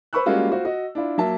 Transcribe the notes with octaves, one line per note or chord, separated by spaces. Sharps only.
B4 C5 B5 C#6 E6 F#6
G3 G#3 A#3 C#4 F4 F#4
F4 F#4 C5
F#4 D#5
D4 E4 F4
F#3 A#3 E5 A5